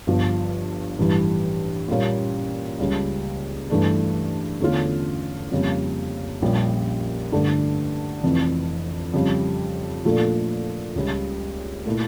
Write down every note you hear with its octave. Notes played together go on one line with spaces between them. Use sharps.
G1 G2 F3
A1 G2 E3 G3
A#2 G3 A#3 C#4
C#2 C#3 G3
G2 E3 A3 D4
E2 D3 A3 C#4 F4
F2 C#3 G3 A#3
A#1 A#2 G3 C#4 G4
G2 D3 A3 D4
F1 F2 E3
F2 C#3 G3
A#2 F3 A3 D4 A4
C#2 C#3 G3
A#2 A3 E4 A4